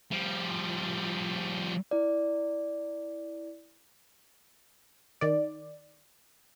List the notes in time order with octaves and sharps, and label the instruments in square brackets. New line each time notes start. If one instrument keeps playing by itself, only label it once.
[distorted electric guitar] F3 G3
[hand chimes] E4 D5
[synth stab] D#3 D5